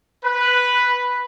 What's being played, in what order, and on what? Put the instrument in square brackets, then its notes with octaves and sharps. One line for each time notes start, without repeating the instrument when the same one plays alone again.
[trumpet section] B4